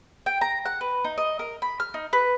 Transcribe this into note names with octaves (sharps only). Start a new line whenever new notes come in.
G5
A#5
F#5
B4
D#4
D#5
A#4
B5
F6
D#4
B4